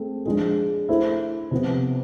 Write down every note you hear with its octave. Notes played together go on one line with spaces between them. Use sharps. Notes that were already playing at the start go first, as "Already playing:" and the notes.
Already playing: A3 C4 G#4
F3 G#3 D4 G#4
A3 E4 A4 C5
C3 F3 B3